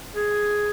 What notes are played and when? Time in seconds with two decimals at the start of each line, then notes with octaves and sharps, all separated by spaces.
0.15 G#4